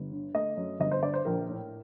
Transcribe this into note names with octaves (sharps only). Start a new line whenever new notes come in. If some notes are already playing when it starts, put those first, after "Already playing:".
Already playing: G1
D3
A3 D#5
F#2
G1 D#5
C5
D3 D5
C5
A#1 A#4
A2